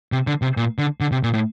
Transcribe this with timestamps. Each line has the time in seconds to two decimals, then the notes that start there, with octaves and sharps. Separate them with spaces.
0.12 C3
0.27 D3
0.42 C3
0.57 A#2
0.78 D3
1.01 D3
1.12 C3
1.23 A#2
1.34 A2